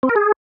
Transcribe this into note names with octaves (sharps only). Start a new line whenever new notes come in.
C4
A#4
G#4